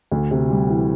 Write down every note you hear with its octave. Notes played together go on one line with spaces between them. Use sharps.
D2
C3
G3
E3